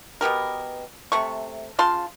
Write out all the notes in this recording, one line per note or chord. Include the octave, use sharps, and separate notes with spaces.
B2 B3 G4 A#4
C3 A3 C#6
C#3 F4 A5 C6